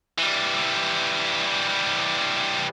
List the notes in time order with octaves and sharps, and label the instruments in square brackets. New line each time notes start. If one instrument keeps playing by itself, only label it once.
[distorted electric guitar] E3 G3